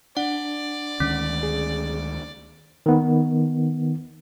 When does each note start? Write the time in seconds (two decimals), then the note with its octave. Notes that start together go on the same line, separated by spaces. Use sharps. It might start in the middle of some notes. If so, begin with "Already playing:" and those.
0.17 D4 D5 F#5
1.00 D2 D#3 G#3 C#4
1.43 G#4
2.86 D#3 B3